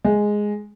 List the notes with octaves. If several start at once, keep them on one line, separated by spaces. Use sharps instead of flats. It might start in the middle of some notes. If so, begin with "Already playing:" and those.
G#3